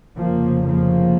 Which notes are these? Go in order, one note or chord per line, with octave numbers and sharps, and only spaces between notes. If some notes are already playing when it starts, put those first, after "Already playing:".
F1 F2 C#3 F3 A#3
F3 A#3